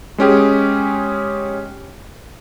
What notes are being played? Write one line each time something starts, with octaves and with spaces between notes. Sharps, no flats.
G#3 C#4 G4 G#4